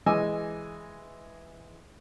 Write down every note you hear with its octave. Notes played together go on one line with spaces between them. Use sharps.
E3 G#3 D#5 G#5 D6 E6